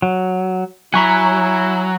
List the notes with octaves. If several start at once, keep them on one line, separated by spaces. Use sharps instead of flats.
F#3
F#3 E4 G#5 A#5 B5 C#6 F#6